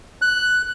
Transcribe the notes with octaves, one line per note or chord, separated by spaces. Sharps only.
F#6